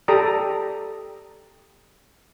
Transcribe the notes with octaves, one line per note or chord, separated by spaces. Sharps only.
G4 A4 D5 A#5 D#6